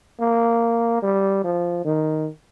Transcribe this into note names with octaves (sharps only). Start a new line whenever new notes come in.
A#3
G3
F3
D#3